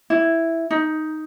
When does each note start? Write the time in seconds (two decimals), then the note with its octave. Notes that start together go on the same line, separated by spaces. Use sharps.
0.10 E4
0.71 D#4